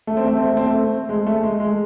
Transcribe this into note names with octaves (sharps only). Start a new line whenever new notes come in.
A3
C4
A3
C4
A3
C4
A3
G#3
A3
G#3
G#3